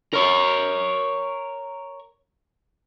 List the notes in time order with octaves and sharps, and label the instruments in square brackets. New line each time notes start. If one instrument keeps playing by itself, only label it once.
[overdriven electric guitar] A#4 C#5